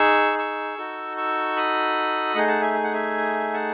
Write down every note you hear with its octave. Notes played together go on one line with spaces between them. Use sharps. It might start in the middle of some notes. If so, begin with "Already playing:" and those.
Already playing: D#4 G#4 C#6 E6
C#6 E6
D#4 F#4 A4
C#6 E6
B5 D#6
A3 D#4 G#4 D#5 F#5
F#5 A5
E5 G#5
G#5
F#5
E5 G#5
F#5 A5